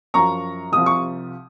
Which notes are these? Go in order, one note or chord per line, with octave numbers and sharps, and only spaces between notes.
F#2 F3 A#5 C#6
C2 C3 F3 D#6
C#6